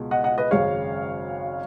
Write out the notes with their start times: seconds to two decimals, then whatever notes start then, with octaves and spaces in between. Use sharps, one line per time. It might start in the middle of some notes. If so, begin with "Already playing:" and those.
Already playing: C#2 B2 G#3
0.11 D#5 F#5
0.24 D#5 F#5
0.38 B4 D#5
0.51 G#1 F#2 C#3 G#3 C#5 F5